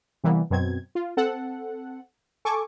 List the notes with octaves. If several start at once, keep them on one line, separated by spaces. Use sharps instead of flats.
C3 E3 G3 A#3 B3
F#2 B2 F#3 C4 G#6
F4
C4 A4 F#5
A4 G#5 C#6 D6